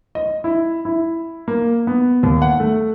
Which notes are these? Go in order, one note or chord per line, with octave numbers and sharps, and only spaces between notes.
D#5
E4
E4
A#3
B3
D#2
F#5
A3